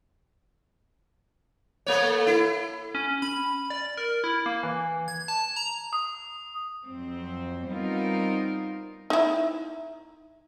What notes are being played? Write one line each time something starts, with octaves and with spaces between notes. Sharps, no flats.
A3 A#3 C#5
E4
C#4
B5
D5
A#4
E4
A#3
E3
G#6
A5
A#5
D#6
F2 F#3 C4
G3 B3 C4 D#4 F4 A#4
D#4 E4